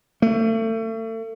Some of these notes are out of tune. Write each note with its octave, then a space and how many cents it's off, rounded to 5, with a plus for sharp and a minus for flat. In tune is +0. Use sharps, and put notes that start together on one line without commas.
A3 +35